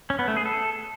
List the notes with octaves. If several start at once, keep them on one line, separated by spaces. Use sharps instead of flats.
C#4
B3
A3
G#4
A4